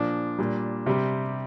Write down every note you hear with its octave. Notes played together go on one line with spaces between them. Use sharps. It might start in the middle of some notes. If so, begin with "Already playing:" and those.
Already playing: A#2 F3 D4
A#2 G3
C3 G3